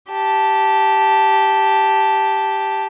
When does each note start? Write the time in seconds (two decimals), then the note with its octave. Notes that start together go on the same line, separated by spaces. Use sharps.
0.10 G4 A5